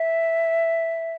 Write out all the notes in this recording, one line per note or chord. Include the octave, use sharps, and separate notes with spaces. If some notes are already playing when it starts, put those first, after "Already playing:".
Already playing: E5